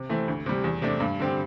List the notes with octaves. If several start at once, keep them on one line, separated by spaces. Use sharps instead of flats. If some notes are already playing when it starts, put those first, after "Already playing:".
Already playing: C3
E3 A3 C4
D2
C3 G3
E2
C3 A3 D4
G2
D3 C4 G4